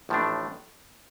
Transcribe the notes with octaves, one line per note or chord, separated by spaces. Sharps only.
A1 A2 F3 A3 D4